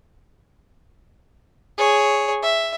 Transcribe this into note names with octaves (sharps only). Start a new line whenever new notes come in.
G#4 C#5
E5